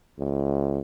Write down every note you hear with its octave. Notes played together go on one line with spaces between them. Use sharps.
C#2